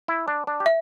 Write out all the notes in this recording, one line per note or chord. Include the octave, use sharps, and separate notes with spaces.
E4
D4
D4
G4
E5